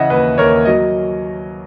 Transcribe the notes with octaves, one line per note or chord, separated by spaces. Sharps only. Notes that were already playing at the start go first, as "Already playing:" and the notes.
Already playing: C#3 E3 D#5 E5 F#5
D#2 B4 D#5
D#2 A#4 C#5
F#3 D#5